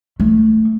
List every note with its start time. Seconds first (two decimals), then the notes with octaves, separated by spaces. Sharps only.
0.20 A3